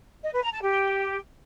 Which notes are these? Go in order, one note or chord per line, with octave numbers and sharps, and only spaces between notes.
D#5
B4
A#5
A5
G4